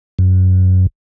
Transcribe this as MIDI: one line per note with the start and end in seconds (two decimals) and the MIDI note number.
0.19 0.87 42